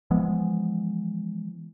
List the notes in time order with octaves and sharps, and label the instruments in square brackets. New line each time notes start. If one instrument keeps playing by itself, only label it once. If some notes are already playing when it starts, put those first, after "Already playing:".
[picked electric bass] E3 F3 G#3 B3